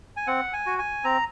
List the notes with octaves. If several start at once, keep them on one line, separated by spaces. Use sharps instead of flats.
G#5
C4 F#5
G#5
F#4
G#5
C4 A#5